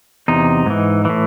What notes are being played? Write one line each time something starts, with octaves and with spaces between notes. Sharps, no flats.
E2 C3 D#4
G#2 E3
A2 E3